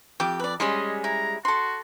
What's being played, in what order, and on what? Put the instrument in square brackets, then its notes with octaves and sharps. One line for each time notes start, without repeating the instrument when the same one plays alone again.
[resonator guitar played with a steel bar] F2 [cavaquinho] G4 D6
[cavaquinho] B4 D5
[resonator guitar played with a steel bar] G3 G#3 C#4 [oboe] D#5 [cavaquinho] C6
[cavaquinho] E4 [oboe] A#5
[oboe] F#4 [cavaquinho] A4 C6